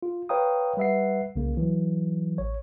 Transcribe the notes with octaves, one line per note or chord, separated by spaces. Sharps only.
F4
B4 C#5 F5 G5 A#5 D#6
G3 B4 E5 F#5 C7
C2 C#3 A#3
E3 F#3
A1 C#5